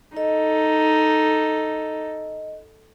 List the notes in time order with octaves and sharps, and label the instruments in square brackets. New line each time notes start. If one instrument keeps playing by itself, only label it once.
[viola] D#4 A4 [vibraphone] D#5